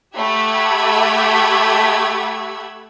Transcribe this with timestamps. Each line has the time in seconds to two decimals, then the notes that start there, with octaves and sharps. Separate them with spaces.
0.15 A3 G4 F#5 B5 E6 G#6